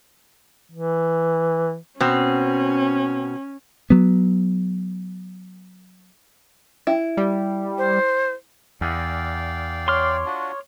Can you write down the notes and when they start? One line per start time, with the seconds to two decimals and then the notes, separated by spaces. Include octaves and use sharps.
0.72 E3
2.00 B2 C4 C#4
3.90 F#3 B3
6.87 E4
7.17 G3
7.78 C5
8.81 E2 D5 F5 G5
9.88 C#5 C6 D6 F6
10.26 D4 F4 F#4